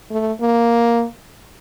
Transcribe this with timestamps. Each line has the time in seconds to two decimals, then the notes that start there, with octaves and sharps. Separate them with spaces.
0.11 A3
0.41 A#3